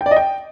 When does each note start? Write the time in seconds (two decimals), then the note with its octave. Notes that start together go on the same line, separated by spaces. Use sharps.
0.01 G5
0.06 D5
0.11 D#5
0.16 G5